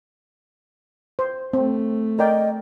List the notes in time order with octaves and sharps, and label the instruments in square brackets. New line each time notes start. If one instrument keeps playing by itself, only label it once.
[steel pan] C5
[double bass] A3 [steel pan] C4
[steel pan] A#4 D5 G5 [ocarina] D#5